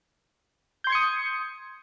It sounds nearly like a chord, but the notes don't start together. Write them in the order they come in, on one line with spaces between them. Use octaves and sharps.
G6 C6 G#6 C#7 D#6